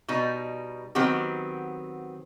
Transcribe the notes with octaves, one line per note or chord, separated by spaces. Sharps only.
B2 G3 D#4
D#3 F#3 B3 C4 G4